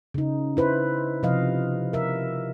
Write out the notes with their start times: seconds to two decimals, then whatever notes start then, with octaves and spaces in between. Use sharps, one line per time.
0.14 C#3 D#4
0.57 E4 B4 C5
1.23 C3 F3 D#5 F5
1.93 A#4 E5